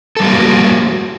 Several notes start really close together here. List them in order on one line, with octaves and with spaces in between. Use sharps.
A4 G3 G4 A#3 F#4